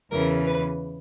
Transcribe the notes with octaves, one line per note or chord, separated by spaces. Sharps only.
E2 C#3 E3 A#4
B4